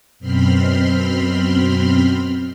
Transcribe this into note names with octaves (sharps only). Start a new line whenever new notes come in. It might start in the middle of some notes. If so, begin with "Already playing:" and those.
F#2 B2 C4 B5 C6 F6